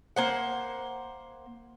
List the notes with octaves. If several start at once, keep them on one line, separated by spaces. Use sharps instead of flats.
A#3 C5 F#5